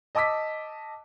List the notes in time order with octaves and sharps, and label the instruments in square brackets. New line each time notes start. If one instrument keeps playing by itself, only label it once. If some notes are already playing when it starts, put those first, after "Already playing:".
[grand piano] D#5 A5 D6 E6 B6